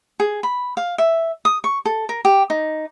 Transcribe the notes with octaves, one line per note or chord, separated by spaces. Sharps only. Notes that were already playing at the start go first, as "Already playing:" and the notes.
G#4
B5
F5
E5
D#6
C#6
A4
A#4
G4
D#4